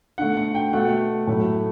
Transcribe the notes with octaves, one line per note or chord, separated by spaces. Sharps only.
D3 A3 F#5
F#5
G5
B2 A3 F#5
A2 F#3 A3